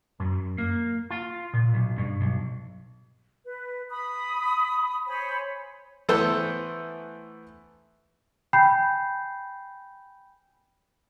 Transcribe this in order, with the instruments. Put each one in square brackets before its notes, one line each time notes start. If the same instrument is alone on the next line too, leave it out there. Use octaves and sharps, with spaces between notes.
[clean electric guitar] F#2
A#3
F4
A#2
B1
G2
B1
[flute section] B4
B5 D#6
C5 C#5 G#5 B5
[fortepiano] E3 A3 B3 A4 C5
[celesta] G5 G#5 B5 G6 C7